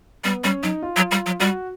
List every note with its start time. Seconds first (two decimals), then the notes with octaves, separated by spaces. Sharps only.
0.24 G3 B3
0.44 G3 C#4
0.63 F#3 D#4
0.82 F4
0.96 F#3
1.11 G3
1.26 F#3
1.40 G3 F#4